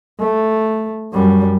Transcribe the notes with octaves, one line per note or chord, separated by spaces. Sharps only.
A3
F#2 G3